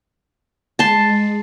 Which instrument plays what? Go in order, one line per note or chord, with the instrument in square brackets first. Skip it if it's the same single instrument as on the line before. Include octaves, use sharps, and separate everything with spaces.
[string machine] G#3 [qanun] A5 C6